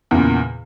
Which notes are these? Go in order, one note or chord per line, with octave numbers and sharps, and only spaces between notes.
E2 A#2 C#3